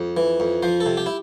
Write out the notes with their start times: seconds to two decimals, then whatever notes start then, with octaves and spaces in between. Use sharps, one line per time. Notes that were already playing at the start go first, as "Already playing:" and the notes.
Already playing: F2
0.17 E3
0.40 F2
0.63 F3 C5
0.80 A4
0.86 C3
0.97 G4
1.06 E4